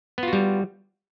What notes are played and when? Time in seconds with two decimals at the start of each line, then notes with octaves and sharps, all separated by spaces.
0.18 B3
0.23 F4
0.28 F#4
0.33 G3